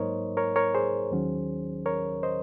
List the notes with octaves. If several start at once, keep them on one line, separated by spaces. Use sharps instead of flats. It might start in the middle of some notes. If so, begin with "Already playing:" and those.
Already playing: G#2 F#3 A#3 D#4 A#4 C5 C#5 D#5
A#4 C#5
A#4 C#5
G#4 C5
D#2 D#3 F#3 C#4
A#4 C#5
C5 D#5